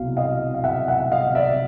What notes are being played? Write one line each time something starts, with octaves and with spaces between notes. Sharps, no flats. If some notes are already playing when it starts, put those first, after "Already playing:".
Already playing: C2 B2 F#3 F5
D#5 F5
F5
E5 F#5
E5 F#5
F#5
D#5 F5
D5 E5